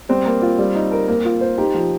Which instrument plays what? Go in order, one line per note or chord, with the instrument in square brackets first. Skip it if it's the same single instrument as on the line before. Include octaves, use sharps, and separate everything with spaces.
[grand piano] G3 [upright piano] C4
[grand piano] A#3
F4
G3
D#4
A#4
A#3
F4
C5
[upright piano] D#4 [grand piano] G4
[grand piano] F3